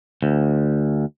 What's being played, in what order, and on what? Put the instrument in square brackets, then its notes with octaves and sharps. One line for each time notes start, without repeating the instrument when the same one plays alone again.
[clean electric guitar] D2